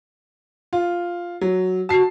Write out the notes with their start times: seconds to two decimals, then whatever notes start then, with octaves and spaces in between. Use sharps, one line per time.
0.73 F4
1.41 F#3
1.89 F#4 A5 C7